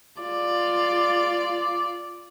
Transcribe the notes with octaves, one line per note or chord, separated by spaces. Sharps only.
F4 D5